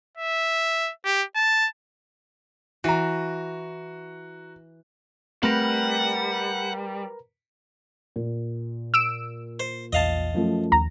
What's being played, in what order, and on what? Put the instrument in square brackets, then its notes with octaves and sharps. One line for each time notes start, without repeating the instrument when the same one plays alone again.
[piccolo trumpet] E5
G4
A5
[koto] E3 [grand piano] F#4 A#5
[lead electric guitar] G3 [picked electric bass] A3 C4 [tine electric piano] A#4 B4 A#5 [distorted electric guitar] F#5
[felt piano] A#2
[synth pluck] E6 D7 E7
[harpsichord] C5
[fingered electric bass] A#1 E2 [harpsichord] D#5 F5 A5
[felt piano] F#2 F3 A3 [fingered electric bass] F#3
[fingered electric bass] D#2 [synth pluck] A#5